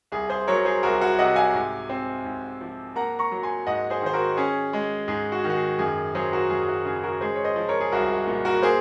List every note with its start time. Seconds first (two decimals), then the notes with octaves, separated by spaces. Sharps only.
0.12 C2 G#4
0.30 G#4 C5
0.47 F#3 A#4 C#5
0.65 G#4 C5
0.83 C2 F#4 A#4
1.01 F#4 A#4
1.19 C3 D#5 F#5
1.36 F5 G#5
1.54 G#2
1.90 C4
2.24 G#2
2.61 F3
2.95 A#3 F#5 A#5
3.19 A#5 C#6
3.32 F#3
3.43 G#5 C6
3.66 G#2 D#5 F#5
3.90 G#4 C5
4.02 D#3 C5
4.13 F#4 A#4
4.37 C#4 G#4
4.73 G#3
5.08 G#2 G#4
5.32 F#4
5.44 D#3
5.50 F#4
5.55 G#4
5.79 F#2 G#4
6.15 F#3 G#4 C5
6.32 F#4 A#4
6.50 F#2 G#4
6.62 G#4
6.68 F#4
6.85 C#3 G#4
7.03 F#4 A#4
7.21 G#3 G#4 C5
7.36 C#5
7.44 C5 D#5
7.56 F3
7.69 A#4 C#5
7.81 G#4
7.92 C2 F#4 A#4
8.27 A#2
8.45 F#4 A#4
8.62 A#3 G#4 C5